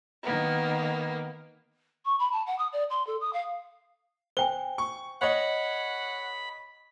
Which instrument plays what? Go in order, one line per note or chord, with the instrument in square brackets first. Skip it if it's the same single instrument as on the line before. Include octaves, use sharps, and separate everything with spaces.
[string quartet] D#3 A#3 B3
[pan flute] C#6
B5
A5
F#5
D#6
D5
C6
A4
D#6
F5
[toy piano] C5 G5 G#5 [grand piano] G7
[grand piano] C#6
[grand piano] C#5 D#5 [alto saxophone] F#5 [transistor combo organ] B5